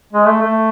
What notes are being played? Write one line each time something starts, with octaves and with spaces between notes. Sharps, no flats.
G#3
A3
A3